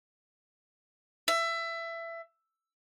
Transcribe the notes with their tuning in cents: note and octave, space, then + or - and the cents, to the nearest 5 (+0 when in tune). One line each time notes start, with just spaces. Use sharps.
E5 +20